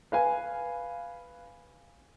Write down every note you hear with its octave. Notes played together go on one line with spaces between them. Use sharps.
B4 F5 G#5